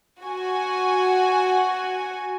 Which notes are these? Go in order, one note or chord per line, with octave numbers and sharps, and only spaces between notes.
F#4 G#5